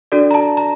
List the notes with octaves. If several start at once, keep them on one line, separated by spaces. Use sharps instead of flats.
D4 F#4 A4 D5
A#5
A5
A#5